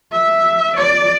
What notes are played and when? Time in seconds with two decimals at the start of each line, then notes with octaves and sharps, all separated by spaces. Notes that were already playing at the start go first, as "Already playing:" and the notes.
0.13 E5
0.76 D5